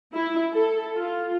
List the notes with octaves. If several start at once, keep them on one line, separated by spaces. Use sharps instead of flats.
E4
A4
F4